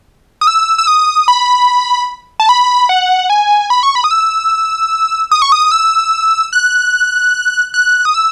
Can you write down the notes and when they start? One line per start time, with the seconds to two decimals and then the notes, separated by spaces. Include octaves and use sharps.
0.41 D#6
0.47 E6
0.78 E6
0.87 D#6
1.28 B5
2.40 A5
2.49 B5
2.89 F#5
3.30 G#5
3.70 B5
3.83 C#6
3.95 B5
4.04 D#6
4.11 E6
5.31 D#6
5.42 C#6
5.52 D#6
5.71 E6
6.53 F#6
7.74 F#6
8.05 D#6
8.14 E6